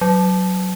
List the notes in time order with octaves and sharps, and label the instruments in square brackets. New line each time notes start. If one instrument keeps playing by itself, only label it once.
[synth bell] F#3